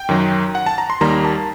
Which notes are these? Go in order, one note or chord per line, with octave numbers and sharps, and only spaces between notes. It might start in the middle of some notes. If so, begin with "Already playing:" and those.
Already playing: G5
F#2 D#3 F#3
F#5
A5
A#5
C6
D#2 D#3 G3 A#3 A#5
A5